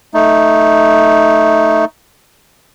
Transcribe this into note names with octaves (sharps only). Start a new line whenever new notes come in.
A3 D#4